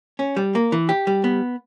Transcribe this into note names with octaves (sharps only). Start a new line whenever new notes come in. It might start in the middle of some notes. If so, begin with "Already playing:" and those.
C#4
G3
A#3
E3
G4
G3
B3